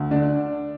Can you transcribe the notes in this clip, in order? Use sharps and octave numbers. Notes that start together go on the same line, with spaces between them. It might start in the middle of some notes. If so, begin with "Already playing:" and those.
Already playing: D2
D3 D4 D5